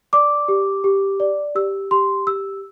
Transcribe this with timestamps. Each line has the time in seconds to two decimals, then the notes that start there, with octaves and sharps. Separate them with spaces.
0.13 D5 D6
0.48 G4
0.84 G4
1.20 D5
1.55 G4 E6
1.91 G4 C6
2.27 G4 E6